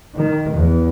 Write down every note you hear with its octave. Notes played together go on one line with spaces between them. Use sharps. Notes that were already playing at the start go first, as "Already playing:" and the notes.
D#3
E2